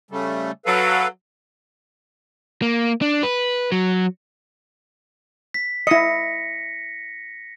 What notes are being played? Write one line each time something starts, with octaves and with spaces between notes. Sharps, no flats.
C#3 G3 A3
F#3 A4 B4 F5
A#3
D4
B4
F#3
B6
E4 D#5 A#6 C#7